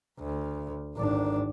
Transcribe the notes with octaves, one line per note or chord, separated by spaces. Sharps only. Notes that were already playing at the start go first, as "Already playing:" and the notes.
D2
G#1 D4